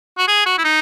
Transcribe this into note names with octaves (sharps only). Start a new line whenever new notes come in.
F#4
G#4
F#4
E4
D#4